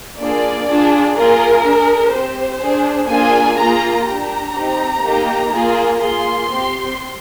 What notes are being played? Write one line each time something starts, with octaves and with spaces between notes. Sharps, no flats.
A#3 D4 F4 G#4 D5
D4 F4 G#4
A#3 F4 G#4 A#4
D4 G#4
C4 G4 C5
D4 G#4
A#3 D4 F4 G#4 G#5
A#3 F4 G#4 A#5
D4 G4 A#5
C4 D#4 G4
A#3 D#4 G4
A#3 F4 G#4
A#3 F4 G#4 C6
C4 G4